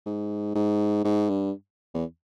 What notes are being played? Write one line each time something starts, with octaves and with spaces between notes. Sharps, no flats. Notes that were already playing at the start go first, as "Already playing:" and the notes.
G#2
G#2
G#2
G2
E2